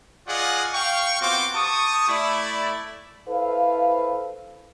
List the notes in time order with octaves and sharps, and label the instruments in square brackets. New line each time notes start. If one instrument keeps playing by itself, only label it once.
[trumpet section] F4 G#4 D5 D#5 F5 F#5
F5 G5 C#6
B3 C4 F4 F#4 C6 D6
G4 A5 C#6 D#6
A3 E4 D5
[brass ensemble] E4 A4 B4 C5 F5